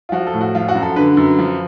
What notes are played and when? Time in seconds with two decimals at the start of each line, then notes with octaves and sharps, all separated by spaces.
0.09 F4
0.12 F3 F#4
0.27 A4
0.34 A2
0.41 F#4
0.55 F3 F4
0.68 F#4
0.75 F#2
0.83 A4
0.96 D3 B4
1.17 F#2
1.39 F3